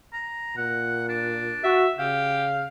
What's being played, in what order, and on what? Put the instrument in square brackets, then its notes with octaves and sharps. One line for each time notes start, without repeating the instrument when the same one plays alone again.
[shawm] A#5
[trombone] A#2 [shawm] F#5
[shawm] D4
[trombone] F#4 [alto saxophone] E5
[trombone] C#3 [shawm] G4 [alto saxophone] F5